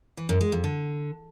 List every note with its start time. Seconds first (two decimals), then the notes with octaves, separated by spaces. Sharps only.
0.17 E3
0.29 F#2
0.41 G#3
0.52 F2
0.64 D3